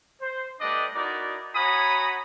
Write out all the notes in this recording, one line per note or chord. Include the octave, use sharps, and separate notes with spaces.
C5
G3 A3 D4 B4 D5 D#5
D#4 E4 F#4 A#4 D5
F#4 C#5 G#5 A#5 B5 D#6